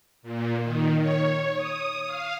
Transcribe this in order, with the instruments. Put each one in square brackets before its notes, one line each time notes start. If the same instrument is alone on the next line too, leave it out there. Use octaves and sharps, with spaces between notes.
[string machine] A#2
D#3
C#5
D#6
F5